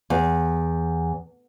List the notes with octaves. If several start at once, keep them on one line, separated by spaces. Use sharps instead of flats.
E2